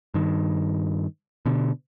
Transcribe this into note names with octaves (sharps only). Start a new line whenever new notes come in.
G2 D#3
B2 D3